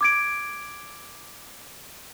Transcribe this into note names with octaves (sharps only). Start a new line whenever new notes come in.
D6 G#6 D7